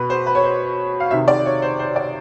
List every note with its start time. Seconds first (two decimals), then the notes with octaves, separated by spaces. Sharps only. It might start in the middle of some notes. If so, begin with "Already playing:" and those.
Already playing: B2 B4
0.10 C5
0.26 B4
0.35 C#5
0.44 C5
1.00 F5
1.11 C3 D#3 E5
1.28 D5
1.46 C#5
1.62 C5
1.79 C5
1.96 D5